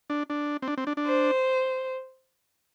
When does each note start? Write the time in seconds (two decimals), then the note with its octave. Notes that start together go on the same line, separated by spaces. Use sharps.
0.10 D4
0.30 D4
0.62 C4
0.68 D4
0.78 C4
0.87 D4
0.97 D4
1.06 C5